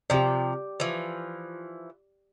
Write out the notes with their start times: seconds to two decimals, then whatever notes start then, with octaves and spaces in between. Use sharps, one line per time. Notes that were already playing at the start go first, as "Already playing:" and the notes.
0.10 C3 F3 G4 D5
0.80 E3 F3